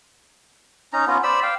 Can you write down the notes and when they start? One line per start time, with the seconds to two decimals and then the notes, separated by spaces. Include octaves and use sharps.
0.93 C#4 D#4 A#5
1.07 B3 C#4 F4
1.23 C5 D5 B5 E6
1.43 F5 G5